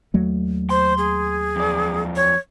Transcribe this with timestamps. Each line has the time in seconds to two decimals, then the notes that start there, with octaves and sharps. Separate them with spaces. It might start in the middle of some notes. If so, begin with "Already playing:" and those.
0.14 D#2 F#3 A3
0.70 C5 C6
0.98 G#4
1.56 F2 D5
2.16 C#5